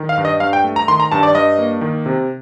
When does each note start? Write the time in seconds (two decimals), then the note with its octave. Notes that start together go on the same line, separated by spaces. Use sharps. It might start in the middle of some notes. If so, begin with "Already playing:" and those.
Already playing: D#3
0.09 F5
0.18 G2
0.25 D#5
0.40 G2 F5
0.53 G5
0.64 A3
0.76 A#5
0.88 D#3 C6
1.00 A#5
1.12 G2 A5
1.23 D5
1.34 G2 D#5
1.58 A#3
1.81 D#3
2.06 C3